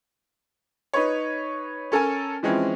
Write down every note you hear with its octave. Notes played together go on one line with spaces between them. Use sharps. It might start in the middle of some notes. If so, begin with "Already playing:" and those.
D#4 B4 C#5
C#4 A4 A#4 G#5 A5
E3 F3 G#3 C4 C#4 E4